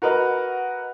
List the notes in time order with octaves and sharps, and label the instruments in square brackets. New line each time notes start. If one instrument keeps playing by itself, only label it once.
[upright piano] F#4 A#4 B4 D#5 F#5